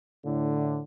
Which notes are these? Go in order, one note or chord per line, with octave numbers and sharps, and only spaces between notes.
A2 D3